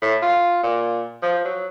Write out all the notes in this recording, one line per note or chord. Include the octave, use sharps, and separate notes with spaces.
A2
F4
A#2
F3
F#3